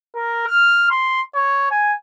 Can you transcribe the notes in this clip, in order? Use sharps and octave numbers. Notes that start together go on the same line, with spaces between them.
A#4
F6
C6
C#5
G#5